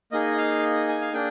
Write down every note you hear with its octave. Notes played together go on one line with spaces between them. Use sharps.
A#3 D#4 G#4 D#5
F5
G#5
F5
A#3 D4 G#4 G5